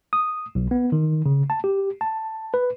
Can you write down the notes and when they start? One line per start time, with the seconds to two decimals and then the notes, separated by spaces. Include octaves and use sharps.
0.13 D#6
0.55 B1
0.71 B3
0.92 D#3
1.26 C#3
1.50 A5
1.64 G4
2.01 A5
2.54 B4